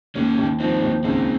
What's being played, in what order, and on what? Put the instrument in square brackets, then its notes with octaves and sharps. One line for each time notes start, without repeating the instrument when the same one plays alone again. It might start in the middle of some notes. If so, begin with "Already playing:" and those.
[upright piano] D#2 [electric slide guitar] A#3 C#4
[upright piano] D#2
[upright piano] F3 [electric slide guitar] C4 D#4
[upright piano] D#2
[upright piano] C#2 [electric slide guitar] C4 D#4